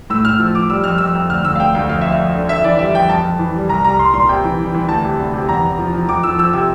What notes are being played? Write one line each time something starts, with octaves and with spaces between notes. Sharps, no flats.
A2 E6
A2 F6
F3 E6
F3 D6
G3 E6
F2 F6
F2 E6
F2
D2 F6
D2 E6
F5
D2 G5
D2 F5
F2 F5
F2 E5
F5
F2
D3
F2 E5
E3 D5
G3 E5
F2 G5
F2 A5
F2
E3
G3
C2 A#5
G3 A#5
C2 C6
A#2 C6
C3 G5
E3
E3
E3
D2 A5
C3
D2
C3
E2 A#5
E2
F3
F3
F2 D6
F3 E6
F3 E6
C3 E6